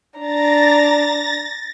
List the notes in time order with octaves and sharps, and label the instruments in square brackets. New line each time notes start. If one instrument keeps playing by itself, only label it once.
[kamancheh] D4 A#5 [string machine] A6 A#6